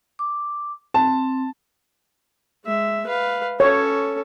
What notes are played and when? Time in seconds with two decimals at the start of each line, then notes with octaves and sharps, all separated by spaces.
0.19 D6
0.94 C4 A5
2.65 G#3 E5
3.06 B4 F5
3.60 C#4 A4 C#5